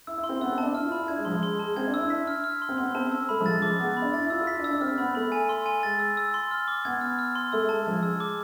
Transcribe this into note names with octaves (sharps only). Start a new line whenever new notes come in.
E4 E6
E4
C6
C4
B3 E6
C4
D4 A5
E4 F6
F4
B5
E4
D4 G#6
G#3
F3 C6
G#3
C6
G#3
A5
G#3
C4 G#6
D4
E6
E4
D4 B6
F6
F6
C6
C4
B3 C6
C4 A5
E6
A3 B5
F3
G#3 A6
F3
D6
G#3
B3 D6
B5
D4
E4 A6
F4 E6
F4
E4 B6
D4
E6
D4
C4 F6
B3 B5
A3 B5
G#5
C6
G#5
G#3 A6
E6
E6
C6
F6
D6
B3 G#6
F6
F6
C6
A3 E6
G#3 A5
F3 G#6
G#3 E6
D6